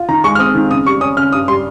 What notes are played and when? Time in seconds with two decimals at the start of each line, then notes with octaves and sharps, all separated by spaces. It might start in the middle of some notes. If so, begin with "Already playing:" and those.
Already playing: F4
0.08 D#3 A#5
0.24 G#3 C#6
0.35 F6
0.39 C4 D#6
0.55 D#3
0.70 C#3 D#6
0.86 G3 C#6
1.01 C#4 D#6
1.17 C#3 F6
1.33 G2 D#6
1.48 G3 C6